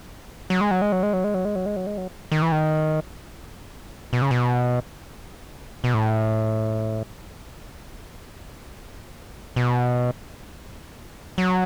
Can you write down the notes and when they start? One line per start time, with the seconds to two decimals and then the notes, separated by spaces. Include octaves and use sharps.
0.50 F#3
0.61 G#3
0.71 F#3
0.82 G#3
0.92 F#3
1.03 G#3
1.13 F#3
1.24 G#3
1.34 F#3
1.45 G#3
1.55 F#3
1.66 G#3
1.76 F#3
1.86 G#3
1.97 F#3
2.32 D#3
2.42 E3
2.52 D#3
4.13 B2
4.22 C#3
4.31 B2
5.84 B2
5.94 A2
9.56 B2
11.38 F#3